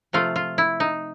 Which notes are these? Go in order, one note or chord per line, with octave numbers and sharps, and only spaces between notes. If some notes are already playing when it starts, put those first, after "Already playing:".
C3 F3 A3 F4
F4
E4
D#4